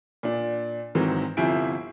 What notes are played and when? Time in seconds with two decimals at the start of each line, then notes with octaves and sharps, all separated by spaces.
0.23 A#2 D4
0.95 G#2 D#3 E3 F#3 C4
1.37 G1 C3 F3 E4 G#5 D7